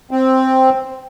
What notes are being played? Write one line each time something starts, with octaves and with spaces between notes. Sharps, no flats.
C4